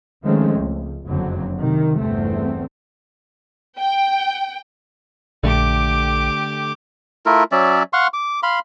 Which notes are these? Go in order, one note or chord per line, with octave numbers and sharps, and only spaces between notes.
D#3 F3 G#3 A3 C4 C#4
C#2
F#1 F2 D3 F#3 C4
C3 D#3
G1 E2 A3 C4
G5
A#1 D3 A3 G4 D6
A3 E4 F4 A#4
F#3 C#4 D5 E5
F5 F#5 C6 C#6
D6
F5 B5 C6